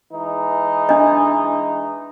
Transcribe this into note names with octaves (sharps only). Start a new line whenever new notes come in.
E3 G#3 D#4
D4 D#5